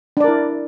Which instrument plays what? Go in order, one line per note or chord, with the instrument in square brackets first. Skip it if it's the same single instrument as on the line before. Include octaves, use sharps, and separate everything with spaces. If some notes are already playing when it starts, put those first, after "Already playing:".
[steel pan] D4
D5
A#4
E4